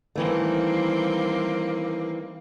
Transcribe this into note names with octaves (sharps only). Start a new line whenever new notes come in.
D#3 E3 G3 A3 A#3 C4